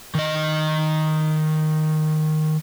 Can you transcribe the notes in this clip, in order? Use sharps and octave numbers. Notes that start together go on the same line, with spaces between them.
D#3 D#5